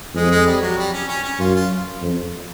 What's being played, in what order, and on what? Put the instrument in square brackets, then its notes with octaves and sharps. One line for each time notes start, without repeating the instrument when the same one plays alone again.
[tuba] F2 [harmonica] G#3
[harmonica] G#3
G3
F#3
G3
C#4
C#4
C#4
[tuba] F#2 [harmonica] F4
[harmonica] F4
[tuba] F2